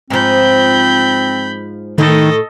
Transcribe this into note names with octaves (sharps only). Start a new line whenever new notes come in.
G#2 F3 C4 B5 G6
A2 D#3 A3 A4 D#5